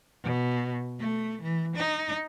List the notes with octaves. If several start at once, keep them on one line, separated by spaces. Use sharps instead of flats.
B2
A3
E3
D#4